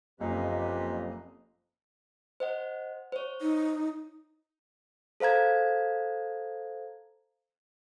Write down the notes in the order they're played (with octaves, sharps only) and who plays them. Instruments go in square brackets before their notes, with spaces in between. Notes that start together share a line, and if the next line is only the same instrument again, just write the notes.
[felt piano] F#1 [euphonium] F2 [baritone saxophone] A#2 [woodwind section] G4 B4 D#5
[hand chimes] C5 D#5 F#5
C5 C#5
[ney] D#4
[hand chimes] A4 C5 F5 A#5 G#6